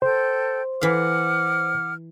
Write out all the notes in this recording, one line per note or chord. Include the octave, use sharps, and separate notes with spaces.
A4 C5 G5 G6
E3 F5 F#5 D6 F6